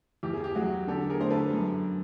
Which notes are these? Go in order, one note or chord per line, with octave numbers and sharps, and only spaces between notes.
E2 G4
G#4
G4
F#3 F#4 G#4
D3 G4 A4
G#4 A#4
D3 C5
A4 B4
F#2